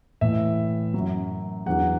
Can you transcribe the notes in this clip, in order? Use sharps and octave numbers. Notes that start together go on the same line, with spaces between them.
A2 E3 E5
F#2 F#3
E2 D3 F#3 F#5